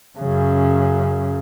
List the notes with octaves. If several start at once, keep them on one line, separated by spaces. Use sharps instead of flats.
F#2 C#3